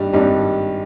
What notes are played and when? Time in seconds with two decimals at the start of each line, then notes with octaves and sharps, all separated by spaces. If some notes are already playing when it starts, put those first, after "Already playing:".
Already playing: G#1 G2 G3
0.13 G#1 G2 G3